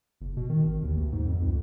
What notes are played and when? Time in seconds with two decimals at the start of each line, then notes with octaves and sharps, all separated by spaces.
0.21 F#1
0.37 B2
0.49 D#3
0.63 G#1
0.83 D#2
0.97 D2
1.12 G#2
1.25 F2
1.42 C#2